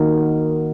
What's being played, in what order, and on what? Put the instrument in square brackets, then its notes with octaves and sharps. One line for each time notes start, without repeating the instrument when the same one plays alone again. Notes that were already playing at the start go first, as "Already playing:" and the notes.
Already playing: [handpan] D#3 A#3 D#4 F#4 A#4